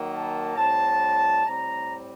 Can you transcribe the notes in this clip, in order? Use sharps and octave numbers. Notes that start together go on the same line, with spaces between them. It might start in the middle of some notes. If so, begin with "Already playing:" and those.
Already playing: D#3 F#3 A#3
A5
A2 G3 C4 A5
A2 G3 C4 A#5